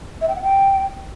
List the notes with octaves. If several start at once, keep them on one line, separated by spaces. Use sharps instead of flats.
E5
G5
F#5
G5